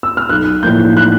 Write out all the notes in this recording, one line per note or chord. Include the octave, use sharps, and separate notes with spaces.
E6
F6
B1 F#6
A2 F3 A#3 G6
F#6